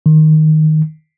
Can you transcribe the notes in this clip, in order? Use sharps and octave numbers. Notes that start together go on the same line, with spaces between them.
D#3